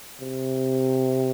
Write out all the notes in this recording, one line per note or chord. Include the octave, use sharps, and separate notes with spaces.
C3